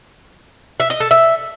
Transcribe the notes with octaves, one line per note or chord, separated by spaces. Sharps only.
E5
D#5
A4
E5